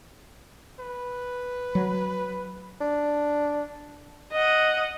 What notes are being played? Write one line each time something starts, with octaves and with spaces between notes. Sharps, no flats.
B4
F#3
D4
D#5 F#5